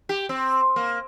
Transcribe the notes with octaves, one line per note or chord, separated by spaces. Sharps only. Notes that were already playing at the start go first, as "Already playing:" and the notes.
G4
C4
A#3